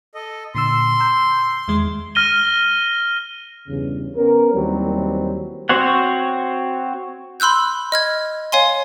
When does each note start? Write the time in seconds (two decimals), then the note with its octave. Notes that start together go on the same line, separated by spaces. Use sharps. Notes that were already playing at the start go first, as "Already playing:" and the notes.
0.15 A4 D#5
0.55 A#2 D3 C6 E6
1.00 A#5 E6 G6
1.68 E2 D#3 G#3
2.15 F6 A#6 D#7 G7
3.68 E2 G2 C#3
4.16 B3 C#4 A#4
4.53 D#2 E3 F#3 G3 C4
5.69 C4 F#4 C5 C#5 F#5
7.40 B5 C6 E6 F#6 G6
7.92 D#5 F6 G#6
8.52 C#5 F5 G#5 C6